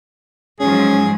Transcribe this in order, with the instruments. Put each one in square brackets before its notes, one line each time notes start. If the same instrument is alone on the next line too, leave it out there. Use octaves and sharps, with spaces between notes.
[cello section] G#2 F3 F#3 [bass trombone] C#4 [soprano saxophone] G#4